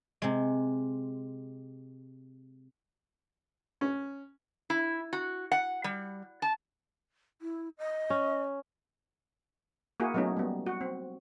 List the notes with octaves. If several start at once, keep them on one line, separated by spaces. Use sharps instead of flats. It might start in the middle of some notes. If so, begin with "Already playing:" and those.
C3 G#3
C#4
E4
F#4
F#5
G3
A5
E4
D#5
C#4
A#3 E4 F#4 G#4
F#3 A3 B3 C#4 D#4
G3 B3
F#4
C4